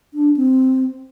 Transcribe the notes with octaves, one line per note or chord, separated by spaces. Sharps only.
D4
C4